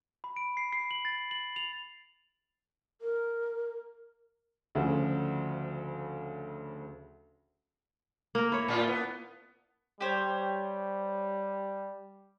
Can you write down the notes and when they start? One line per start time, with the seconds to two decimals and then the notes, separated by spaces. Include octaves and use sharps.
0.24 B5
0.36 D7
0.57 C7
0.72 C7
0.91 F#7
1.05 A6
1.31 F#7
1.56 F7
3.01 A#4
4.75 D2 C#3 F3
8.35 A#3 A#4
8.52 E4 C#5
8.68 A2 F4
8.87 B3
10.01 G3 G4 C5 C#5